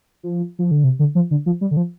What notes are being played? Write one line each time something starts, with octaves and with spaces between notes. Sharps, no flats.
F3
F3
D3
C3
D3
F3
D3
F3
G3
D3
F3